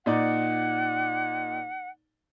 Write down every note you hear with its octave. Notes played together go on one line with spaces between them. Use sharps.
A#2 D#4 D5 F#5